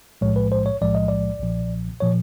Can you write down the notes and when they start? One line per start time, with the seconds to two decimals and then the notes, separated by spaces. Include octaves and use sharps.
0.21 B1 A2 F3 G#3 C#5
0.36 B4
0.52 C5
0.66 C#5
0.82 B1 A2 F3 G#3 D5
0.95 D#5
1.08 D5
1.40 B1 A#2 F3
2.00 A#2 F3 C#5